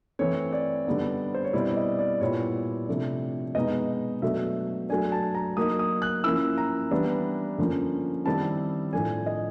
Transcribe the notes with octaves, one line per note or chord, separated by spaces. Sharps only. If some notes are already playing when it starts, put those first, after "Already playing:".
E3 A3 C4 C#5
D5
D3 G3 B3 D#4
C5
C#5
B2 G3 C4 E4 D5
D5
D#5
D5
A#2 G3 B3 E4 C#5
C3 F3 A3 D4
B2 G#3 B3 D#4 D#5
B2 F#3 A3 D4 E5
F#3 A3 D4 G#5
A5
A#5
F#3 A#3 D#4 D#6
D#6
F#6
F3 A#3 C#4 E4 E6
A#5
E3 G3 B3 D4
D3 F3 A#3 C#4
D#3 G3 C4 E4 A5
A2 F3 A3 D4 G#5
D#5